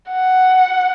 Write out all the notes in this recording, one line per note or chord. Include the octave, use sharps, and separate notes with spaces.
F#5